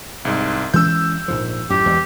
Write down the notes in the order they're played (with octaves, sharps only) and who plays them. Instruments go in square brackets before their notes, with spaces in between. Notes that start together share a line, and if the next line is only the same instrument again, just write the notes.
[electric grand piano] C2 G#2
[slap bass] E3 G#3 C#4 [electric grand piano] E6 G6
[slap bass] A#1 G#2 F3
[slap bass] F#2 A2 [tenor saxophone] G4
[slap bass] E2 G#3